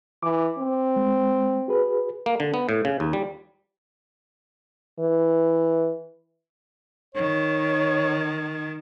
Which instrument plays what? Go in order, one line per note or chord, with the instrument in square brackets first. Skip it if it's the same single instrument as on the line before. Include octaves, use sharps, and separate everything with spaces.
[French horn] E3 [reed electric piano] D6
[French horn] C4
[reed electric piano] G#3
F#4 G#4 B4
[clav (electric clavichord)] A#3
D3
B3
A2
C#3
D#2
G3
[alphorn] E3
[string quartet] D#3 [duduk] C#5